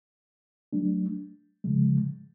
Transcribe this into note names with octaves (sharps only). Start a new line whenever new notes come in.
F#3 A3 D4
C#3 F3 G#3